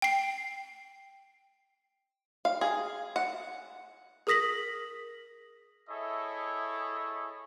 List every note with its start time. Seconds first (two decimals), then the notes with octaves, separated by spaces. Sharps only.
0.02 G5 C7
2.45 F5
2.61 G#4
3.16 F#5
4.27 G#4 A#4 D#6 A#6 B6 F#7
5.90 E4 G#4 A4 C#5 D#5 E5